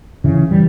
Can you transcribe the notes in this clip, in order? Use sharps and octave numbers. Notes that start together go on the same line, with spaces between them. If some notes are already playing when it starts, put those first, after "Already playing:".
C#3 E3
E3 G3